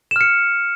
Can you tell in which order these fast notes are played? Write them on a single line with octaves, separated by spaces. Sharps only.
E7 F6 C#7